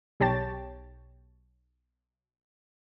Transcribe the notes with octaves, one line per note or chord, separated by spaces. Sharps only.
B1 G4 C#5 G5 A5 A6